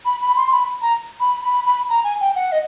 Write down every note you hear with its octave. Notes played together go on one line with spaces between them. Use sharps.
B5
B5
C6
B5
A#5
B5
B5
B5
A#5
G#5
G5
F#5
D#5